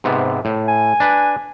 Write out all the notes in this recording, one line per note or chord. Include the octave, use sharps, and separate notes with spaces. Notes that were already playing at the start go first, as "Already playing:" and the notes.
G#2 C3 B3
A2
G#5
D4 B4